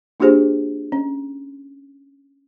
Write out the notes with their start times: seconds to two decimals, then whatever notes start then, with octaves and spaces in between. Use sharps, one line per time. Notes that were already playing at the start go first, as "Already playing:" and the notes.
0.20 A#3 D4 F4 G4 G#4 C5
0.92 C#4